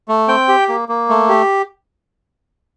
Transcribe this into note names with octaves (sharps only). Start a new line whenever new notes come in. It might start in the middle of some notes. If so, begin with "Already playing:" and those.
A3
C4 G5
G4
A#3
A#3
A3
G4